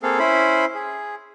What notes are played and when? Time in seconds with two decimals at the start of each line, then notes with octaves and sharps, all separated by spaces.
0.03 A#3 C4 G#4 A4 F5
0.19 C#4 E4 C5 B5
0.75 G#4